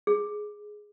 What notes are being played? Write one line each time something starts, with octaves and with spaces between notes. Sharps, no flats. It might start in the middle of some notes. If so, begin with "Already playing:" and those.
G#4